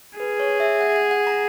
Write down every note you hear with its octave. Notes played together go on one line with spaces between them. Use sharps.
G#4 B4
C#5
E5
F#5
F#5
F#5
A#5